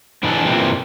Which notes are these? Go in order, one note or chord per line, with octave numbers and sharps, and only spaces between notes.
G#2 E3 D4 D#4 G#4 A4
F2 A#2 E3 G3 C4